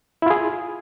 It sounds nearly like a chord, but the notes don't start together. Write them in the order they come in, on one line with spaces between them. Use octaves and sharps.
E4 F4 G#4